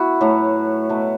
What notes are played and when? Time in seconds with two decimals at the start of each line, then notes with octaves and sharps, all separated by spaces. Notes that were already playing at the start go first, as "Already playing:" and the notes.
Already playing: B3 E4 F#4
0.21 A2 F#3 A3
0.89 B2 F#3 A3